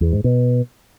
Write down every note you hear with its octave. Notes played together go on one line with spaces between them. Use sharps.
E2
G#2
B2